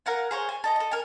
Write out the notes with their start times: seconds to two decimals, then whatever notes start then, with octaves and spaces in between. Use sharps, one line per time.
0.06 A#4 F5 F#5 G#5
0.31 G#4 C5 C#5
0.49 G#5
0.64 A4 D#5 A#5
0.76 A4 D#5
0.91 A#4 G#5